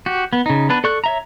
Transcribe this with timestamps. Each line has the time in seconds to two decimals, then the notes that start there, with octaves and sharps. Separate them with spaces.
0.06 F#4 G4
0.33 B3
0.46 C#3 D#4
0.69 B3 D4 B4
0.84 A4 D5 C#6 F#6
1.04 C#5 E5 A#5